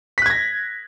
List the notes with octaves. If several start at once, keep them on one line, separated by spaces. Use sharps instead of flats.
F#6 G#6 A#6 B6